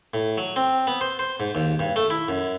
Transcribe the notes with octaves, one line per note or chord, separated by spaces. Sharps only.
A2
F#3
C4
B3
C5
C5
G#2
D#2
G2
A3
E4
F#2